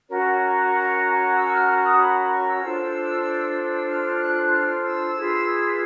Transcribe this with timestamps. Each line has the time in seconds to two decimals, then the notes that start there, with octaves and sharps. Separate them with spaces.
0.08 C#4 F#4 A#4 C#5
1.36 E6
1.52 F6
1.67 F6
1.83 D#6
1.99 B5
2.15 B5
2.31 C#6
2.46 E6
2.62 D4 F4 A4 C5
3.89 F6
4.21 F#6
4.52 F6
4.84 E6
5.16 F4 G#4 B4